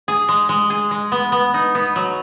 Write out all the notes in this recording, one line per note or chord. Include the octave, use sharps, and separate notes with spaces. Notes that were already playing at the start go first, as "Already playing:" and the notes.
G#4
G#3
G#3
G#4
G#3
B3
B3
D#4
B3
F#3